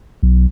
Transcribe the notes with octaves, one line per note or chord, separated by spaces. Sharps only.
B1